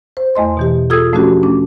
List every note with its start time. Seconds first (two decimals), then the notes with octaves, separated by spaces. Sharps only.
0.17 C5
0.35 E2 A3 D#5 C6
0.57 B2 E3 G4
0.90 F4 G#4 A4 D#6 E6 G#6
1.13 F3 A3 C#4 D4 F#4 G4
1.43 A3 C#4 D4